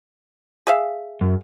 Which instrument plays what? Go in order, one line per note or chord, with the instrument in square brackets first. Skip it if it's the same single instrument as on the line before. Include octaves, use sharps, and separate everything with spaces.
[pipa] G#4 E5 F5
[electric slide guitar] F#2